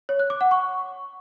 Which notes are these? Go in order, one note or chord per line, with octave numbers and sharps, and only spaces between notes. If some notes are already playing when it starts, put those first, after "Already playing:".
C#5
F#6
D6
F#5
C#6